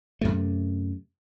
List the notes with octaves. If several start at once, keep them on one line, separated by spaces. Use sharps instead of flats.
F#2 C3 A3